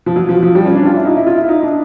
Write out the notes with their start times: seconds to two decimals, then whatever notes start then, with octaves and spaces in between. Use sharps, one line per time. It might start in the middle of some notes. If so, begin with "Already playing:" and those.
0.06 F3
0.16 F#3
0.29 F3
0.43 F3
0.55 G3
0.65 C#4
0.75 D4
0.86 F4
0.96 E4
1.05 D#4
1.16 E4
1.26 F4
1.36 E4
1.49 D#4
1.63 D4